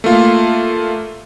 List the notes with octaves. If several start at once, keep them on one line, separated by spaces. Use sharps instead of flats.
A3 A#3 F4